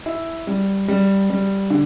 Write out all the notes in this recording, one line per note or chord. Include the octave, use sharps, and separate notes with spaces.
E4
G3
G3
G3
D3